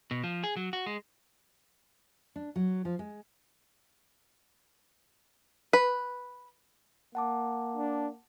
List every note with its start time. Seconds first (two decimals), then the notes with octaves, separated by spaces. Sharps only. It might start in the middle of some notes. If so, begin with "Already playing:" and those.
0.11 B2
0.24 F3
0.44 G#4
0.57 F#3
0.73 F#4
0.86 G#3
2.36 D4
2.56 F#3
2.85 F3
2.99 G#3
5.73 B4
7.15 A#3 F#5 A5 D6
7.77 D4